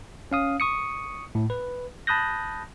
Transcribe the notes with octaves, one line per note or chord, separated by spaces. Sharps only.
C#4 F5 D#6
C#6 D#6 C#7
A2
B4
A5 B5 D#6 F#6 G6 A#6